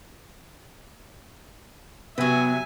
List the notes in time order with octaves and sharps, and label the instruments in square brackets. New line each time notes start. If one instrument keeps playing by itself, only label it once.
[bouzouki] C3 F#3 [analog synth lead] B3 [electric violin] E5 G#5